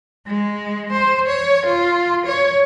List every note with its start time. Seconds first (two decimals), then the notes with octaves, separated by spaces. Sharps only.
0.27 G#3
0.92 C5
1.27 C#5
1.65 F4
2.26 C#5